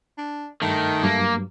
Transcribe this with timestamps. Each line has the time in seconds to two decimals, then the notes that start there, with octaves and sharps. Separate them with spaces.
0.18 D4
0.62 G2 D#3 A3
1.03 G2 F#3 A#3